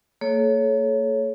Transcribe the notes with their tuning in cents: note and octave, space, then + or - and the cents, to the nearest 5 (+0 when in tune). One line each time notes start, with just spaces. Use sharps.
A#3 -35 A4 -45 C#5 +0